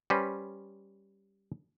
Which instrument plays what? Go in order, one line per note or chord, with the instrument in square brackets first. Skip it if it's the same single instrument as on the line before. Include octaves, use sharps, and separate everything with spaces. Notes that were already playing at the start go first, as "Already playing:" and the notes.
[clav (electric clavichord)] G3 C#4 B4 C5